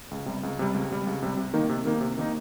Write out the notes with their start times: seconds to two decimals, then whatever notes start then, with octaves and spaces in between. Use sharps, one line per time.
0.11 C#2
0.26 C3 G3
0.43 C#2
0.59 C3 G3
0.74 C#2
0.91 C3 G3
1.07 C#2
1.23 C3 G3
1.37 C3
1.54 D#3 A#3 D#4
1.69 C3
1.85 D#3 A#3 D#4
2.01 C3
2.18 D#3 A#3 D#4